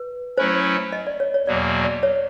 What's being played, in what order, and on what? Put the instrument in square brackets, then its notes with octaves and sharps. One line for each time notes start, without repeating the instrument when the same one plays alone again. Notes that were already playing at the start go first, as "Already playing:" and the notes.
Already playing: [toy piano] B4
[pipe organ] F#3 A3 C#4 E4 [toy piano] C5
[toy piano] D#5
D5
C#5
C#5
[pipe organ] E2 B2 F#3 A#3 [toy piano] D5
[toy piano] D5
C#5